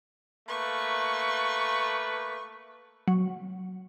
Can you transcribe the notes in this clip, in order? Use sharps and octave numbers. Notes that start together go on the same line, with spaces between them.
A3 A#3 B4 C#6
F#3